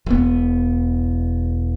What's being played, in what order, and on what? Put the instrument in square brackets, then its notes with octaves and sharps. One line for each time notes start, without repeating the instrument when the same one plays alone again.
[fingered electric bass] E1 B3